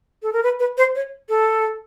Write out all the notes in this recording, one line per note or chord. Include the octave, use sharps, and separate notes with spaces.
A4
A#4
B4
B4
C5
C#5
A4